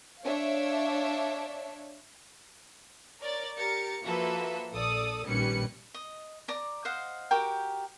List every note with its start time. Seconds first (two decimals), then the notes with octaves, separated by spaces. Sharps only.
0.22 D4 C#5 E5 F5
3.21 A#4 C#5 D5 A6
3.57 G4 A#4 A6 C#7
4.03 F3 A#3 F#4 A4 B4 E5
4.72 A#1 A4 D5 D#6
5.25 A#1 D#3 G3 C#4 B4 C#7
5.94 D#5
6.48 D5 A#5 D6
6.85 C5 D#5 F5 F#5
7.31 F#4 G4 A#4 G5